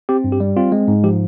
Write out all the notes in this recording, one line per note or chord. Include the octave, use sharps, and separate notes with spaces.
C4 G4
G2
G4
G3
C4 F4
G#3
G#2
F3 G4